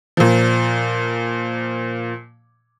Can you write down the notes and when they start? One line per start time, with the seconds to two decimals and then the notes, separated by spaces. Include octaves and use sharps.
0.17 A#2 F3